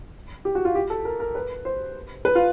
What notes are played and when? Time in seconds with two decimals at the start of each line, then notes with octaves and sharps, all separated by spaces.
0.45 G4
0.55 F#4
0.65 F4
0.75 G4
0.90 A4
1.05 A#4
1.20 A#4
1.35 B4
1.65 C5
2.25 B4
2.35 F4